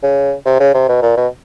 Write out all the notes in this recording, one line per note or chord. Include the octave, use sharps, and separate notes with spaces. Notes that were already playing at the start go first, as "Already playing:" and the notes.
C#3
C3
C#3
C3
B2
A#2
B2